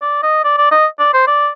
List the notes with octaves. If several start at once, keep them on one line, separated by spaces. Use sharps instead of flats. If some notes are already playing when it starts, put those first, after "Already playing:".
D5
D#5
D5
D5
D#5
D5
C5
D5